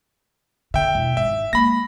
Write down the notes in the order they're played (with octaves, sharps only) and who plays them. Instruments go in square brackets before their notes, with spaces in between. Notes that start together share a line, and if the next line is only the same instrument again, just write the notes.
[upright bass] D3 [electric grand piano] E5 G5
[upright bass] E1
[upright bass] G#1 [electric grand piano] E5
[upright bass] G#3 A#3 [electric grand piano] B5 A#6